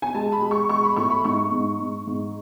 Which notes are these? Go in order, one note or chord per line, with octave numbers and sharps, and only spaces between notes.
G#5
G#3 A5
B5
G#3
C#6
G#3 C#6
B5
A2 C#6
B5
G#2 C#6
G#2
G#2
G#2